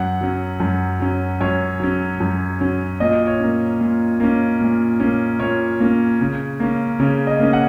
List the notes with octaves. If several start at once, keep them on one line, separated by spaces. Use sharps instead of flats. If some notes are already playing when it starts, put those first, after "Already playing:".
Already playing: F#2 F#5
F#3 C#4
F#2
F#3 C#4
F#2 C#5
F#3 C#4
F#2
F#3 C#4
A#2 D#5
C#5
A#3 C#4
A#2
A#3 C#4
A#2
A#3 C#4
A#2 C#5
A#3 C#4
C#3
A#3 C#4
C#3 C#5
D#5
A#3 C#4
F#5